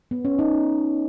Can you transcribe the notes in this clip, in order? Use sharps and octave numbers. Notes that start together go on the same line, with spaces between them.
B3
C#4
D#4